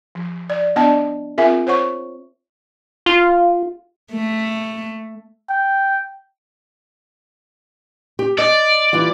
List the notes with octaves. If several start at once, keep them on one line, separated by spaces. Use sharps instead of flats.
F3
D5
B3 D4 D5 D#5 G5 A5
C4 F4 G#4 A#4 E5 G#5
C5 C#5 F#5 C#6
F4
A3
G5
G4
D5 D#5
E3 G3 F4